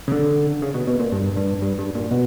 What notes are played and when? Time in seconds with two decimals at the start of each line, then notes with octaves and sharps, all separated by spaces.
0.08 C#3
0.12 D3
0.62 C#3
0.74 B2
0.87 B2
0.99 A#2
1.12 G2
1.36 G2
1.62 G2
1.79 G2
1.95 A#2
2.11 B2